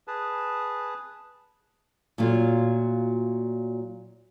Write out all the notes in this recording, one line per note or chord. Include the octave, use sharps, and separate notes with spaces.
G#4 B4 A5
A#2 F#3 A3 F4